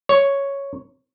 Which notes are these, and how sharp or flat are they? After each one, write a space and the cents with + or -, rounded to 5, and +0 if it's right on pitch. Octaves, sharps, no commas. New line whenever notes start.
C#5 +0